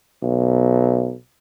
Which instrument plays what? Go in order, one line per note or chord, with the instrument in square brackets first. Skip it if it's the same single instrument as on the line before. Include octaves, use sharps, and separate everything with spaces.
[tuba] B1